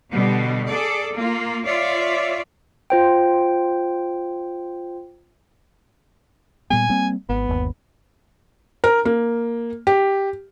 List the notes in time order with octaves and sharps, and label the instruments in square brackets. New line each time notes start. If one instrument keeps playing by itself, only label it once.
[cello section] B2 D3 G3
G#4 A4 D5
A#3 F4
F4 C#5 D5 E5
[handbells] F4 C5 G5
[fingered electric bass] A#2 G3 B3 [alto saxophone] G#5
[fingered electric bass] G3 A#3 C4
[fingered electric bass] G#1 [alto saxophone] B3
[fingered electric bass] G1 D#2
[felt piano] A#4
A#3
G4